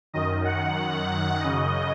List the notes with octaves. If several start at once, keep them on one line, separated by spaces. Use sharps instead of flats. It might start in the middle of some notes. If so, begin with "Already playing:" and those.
F#2 D#3 D#5
F#5
F#2 C#3 D#5